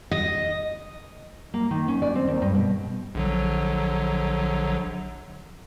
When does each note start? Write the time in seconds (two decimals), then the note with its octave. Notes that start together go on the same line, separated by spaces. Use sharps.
0.11 D#5
1.54 A#3
1.71 D#3
1.88 C#4
2.02 D5
2.15 C4
2.27 D#2
2.42 G2
2.55 B2
3.15 A#1 D3 F#3